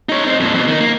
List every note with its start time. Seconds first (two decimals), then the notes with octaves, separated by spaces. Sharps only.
0.09 D#4 C#5
0.23 C4 D#4
0.40 F2 A#2
0.54 F2 B2
0.68 D#3 D#4
0.80 A#3